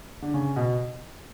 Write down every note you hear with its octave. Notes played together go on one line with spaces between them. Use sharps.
D3
C#3
B2